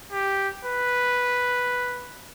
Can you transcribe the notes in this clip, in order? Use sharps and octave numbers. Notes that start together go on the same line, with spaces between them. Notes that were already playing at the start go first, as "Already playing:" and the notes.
G4
B4